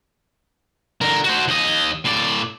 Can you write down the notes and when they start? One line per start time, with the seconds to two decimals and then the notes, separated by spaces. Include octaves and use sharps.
1.01 D3 A#4
1.24 F#4 C5
1.48 D#2 D#5
2.05 A2 D5